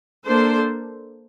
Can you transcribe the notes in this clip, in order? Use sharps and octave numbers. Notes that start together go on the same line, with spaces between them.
A#3 D4 A4 C5